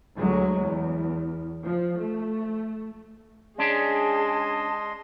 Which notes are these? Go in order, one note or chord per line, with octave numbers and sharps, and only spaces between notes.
D2 F#3 G#3
E2
F3
A3
G#3 C#4 D4 G#4 D#5 A5 C6